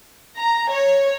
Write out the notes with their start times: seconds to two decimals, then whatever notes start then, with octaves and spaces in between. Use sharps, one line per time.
0.38 A#5
0.71 C#5